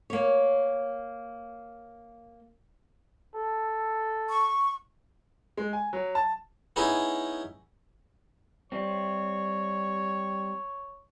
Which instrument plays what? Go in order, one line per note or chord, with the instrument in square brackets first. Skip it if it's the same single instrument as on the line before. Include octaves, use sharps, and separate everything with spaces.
[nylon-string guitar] A#3 C#5
[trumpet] A4
[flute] C#6
[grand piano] G#3
G#5
F#3
A5
[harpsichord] B3 C#4 D#4 E4 G#4
[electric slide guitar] G3 C4 [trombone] C#5